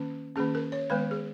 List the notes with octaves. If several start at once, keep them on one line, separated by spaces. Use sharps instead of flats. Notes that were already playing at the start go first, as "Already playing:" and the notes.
Already playing: D#3 A#3 C#4
D#3 A#3 C#4 G#4
A#4
C#5
D#3 G#3 B3 B4
G#4